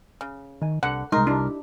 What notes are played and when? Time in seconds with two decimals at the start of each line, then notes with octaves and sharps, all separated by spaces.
0.21 C#3
0.61 D#3 G#5
0.83 C2 D3 F#5
1.12 C2 G#3 D#4 A#4 C6
1.27 D4 E4 G4